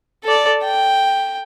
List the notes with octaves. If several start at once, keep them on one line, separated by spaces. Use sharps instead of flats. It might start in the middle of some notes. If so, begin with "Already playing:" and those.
A4 D5
G5